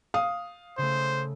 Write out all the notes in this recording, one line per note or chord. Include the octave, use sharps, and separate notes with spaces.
F5 D#6
C#3 A3 C5